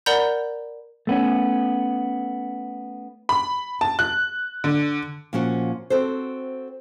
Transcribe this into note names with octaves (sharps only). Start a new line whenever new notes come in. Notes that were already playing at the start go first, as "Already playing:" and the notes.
A#4 D5 F#5 A#5 B5 G6
A3 B3 C#4
B5
A5
F#6
D3
A#2 F3 C#4 F#4 F#5
C4 F#4 A4 C5